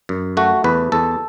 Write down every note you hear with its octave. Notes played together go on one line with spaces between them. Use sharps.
F#2
A3 F#4
E2 B4
E2 A4